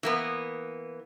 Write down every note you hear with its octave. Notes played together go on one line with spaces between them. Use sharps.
E3 A#3 B3